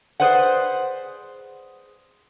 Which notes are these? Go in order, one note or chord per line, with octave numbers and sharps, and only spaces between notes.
G#4 B4 C5 D5 F#5